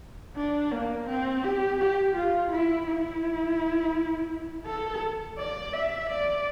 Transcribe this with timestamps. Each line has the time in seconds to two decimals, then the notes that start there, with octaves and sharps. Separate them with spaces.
0.36 D4
0.72 A#3
1.08 C4
1.43 G4
1.79 G4
2.15 F4
2.51 E4
2.87 E4
4.66 A4
5.38 D5
5.73 E5
6.09 D5